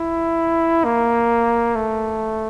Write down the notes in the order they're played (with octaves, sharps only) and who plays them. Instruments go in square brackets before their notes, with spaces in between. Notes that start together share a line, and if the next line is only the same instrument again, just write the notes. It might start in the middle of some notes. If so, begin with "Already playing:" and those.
Already playing: [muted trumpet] E4
A#3
A3